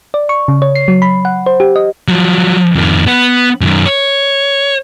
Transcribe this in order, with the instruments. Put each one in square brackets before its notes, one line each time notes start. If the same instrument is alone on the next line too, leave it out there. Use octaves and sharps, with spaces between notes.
[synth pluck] D5
C#6
C#3
C#5
C7
F#3
B5
F#5
C5
G4
D#5
[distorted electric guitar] F3 F#3
F2 D#3
B3
F#2 D#3
C#5